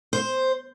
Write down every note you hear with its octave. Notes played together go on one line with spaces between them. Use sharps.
C5